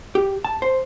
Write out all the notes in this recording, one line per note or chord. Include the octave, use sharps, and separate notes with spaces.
G4
A5
C5